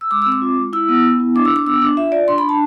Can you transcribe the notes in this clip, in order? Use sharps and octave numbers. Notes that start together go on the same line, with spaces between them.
E6
G#3 D6
E6
C4
D6
F4
G#3
E4 E6
B3
B3
E4
D4 D6
E6
D4
D6
B3 E6
D4 D6
F4 E5
F4 D5
D4 C6
B5
D4
A5